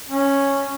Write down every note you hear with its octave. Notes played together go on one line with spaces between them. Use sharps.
C#4